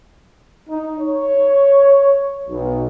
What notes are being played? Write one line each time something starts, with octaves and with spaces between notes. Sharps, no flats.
D#4
C#5
B1